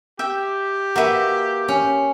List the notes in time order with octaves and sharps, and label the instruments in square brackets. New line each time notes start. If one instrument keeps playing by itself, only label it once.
[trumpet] G4 [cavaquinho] E5 G5
[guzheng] A#3 E5 [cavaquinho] F#4 B4
[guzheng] C#4